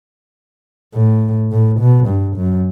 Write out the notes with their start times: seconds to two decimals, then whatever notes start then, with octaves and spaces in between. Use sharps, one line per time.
0.95 A2
1.52 A2
1.80 B2
2.08 G2
2.37 F#2